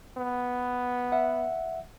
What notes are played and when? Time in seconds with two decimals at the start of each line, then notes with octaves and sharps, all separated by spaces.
0.17 B3
1.12 E5 F#5